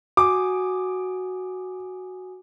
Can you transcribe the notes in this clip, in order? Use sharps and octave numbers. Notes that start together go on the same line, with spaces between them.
F#4 G#5 D6 D#6